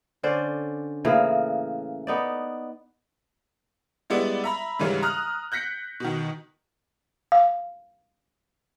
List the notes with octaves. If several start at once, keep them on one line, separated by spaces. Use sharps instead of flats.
D3 C#4 C5 D5
A2 C#3 E3 A#3
B3 D#4 D5
G3 G#3 B3 E4 D5
E5 A#5 B5
G#2 C#3 E3 G3 C#4
A#5 D#6 F6 F#6
F#6 G6 A#6 B6 C#7
B2 D#3
F5